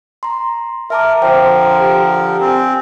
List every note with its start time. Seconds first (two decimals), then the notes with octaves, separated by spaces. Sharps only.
0.23 A#5 C6
0.90 A#4 E5 A5 D6
1.22 D3 F3 A#4 C5 G5
1.81 G4
2.41 C4 G#5